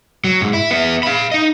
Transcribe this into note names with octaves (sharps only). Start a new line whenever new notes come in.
F#3
G#2
E4
B3 E5
F5 B5
D#4 D#5